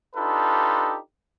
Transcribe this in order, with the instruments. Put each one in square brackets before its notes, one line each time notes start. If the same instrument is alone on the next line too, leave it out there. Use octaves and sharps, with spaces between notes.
[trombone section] D4 D#4 F4 G4 A4 B4